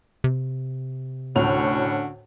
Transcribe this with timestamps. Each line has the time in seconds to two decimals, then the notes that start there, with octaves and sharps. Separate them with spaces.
0.24 C3
1.36 D2 A2 D3 C#4 F#4 F7